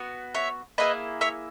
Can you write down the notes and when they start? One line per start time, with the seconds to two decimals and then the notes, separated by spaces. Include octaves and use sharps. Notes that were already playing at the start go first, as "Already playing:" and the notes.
Already playing: B3 F#4
0.35 C#5 E5
0.78 A#3 E4 G#4 B4 D#5
1.21 C#5 E5